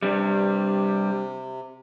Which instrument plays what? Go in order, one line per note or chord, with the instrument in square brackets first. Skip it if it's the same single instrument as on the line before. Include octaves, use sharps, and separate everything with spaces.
[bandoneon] C3 [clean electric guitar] G3 D4